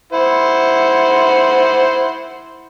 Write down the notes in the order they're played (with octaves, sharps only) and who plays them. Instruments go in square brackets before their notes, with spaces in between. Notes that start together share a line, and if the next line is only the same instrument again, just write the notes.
[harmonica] E4 C5 F#5